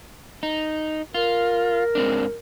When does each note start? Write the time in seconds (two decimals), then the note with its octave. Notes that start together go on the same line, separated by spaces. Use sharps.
0.43 D#4
1.14 F4 A#4
1.95 G#2 C4 D4